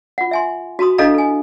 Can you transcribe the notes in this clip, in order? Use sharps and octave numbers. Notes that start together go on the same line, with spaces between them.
F4 F#5
E5 G#5 C6
F#4 A5 A#5 C6 D#6
D4 E4 A4 D#5 F5 A#5
A4 G#5